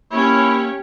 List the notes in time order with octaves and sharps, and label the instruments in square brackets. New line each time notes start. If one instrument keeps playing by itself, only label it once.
[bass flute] A#3 [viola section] C#4 C#5 [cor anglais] E4 [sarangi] G4